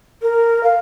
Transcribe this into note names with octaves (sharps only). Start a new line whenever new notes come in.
A#4
F5